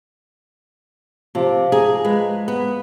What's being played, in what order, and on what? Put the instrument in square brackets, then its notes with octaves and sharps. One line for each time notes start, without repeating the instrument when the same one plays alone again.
[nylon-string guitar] C3 [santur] F3 D6
[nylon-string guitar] G#4 [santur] A#5
[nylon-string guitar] G#3 [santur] B4
[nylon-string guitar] B3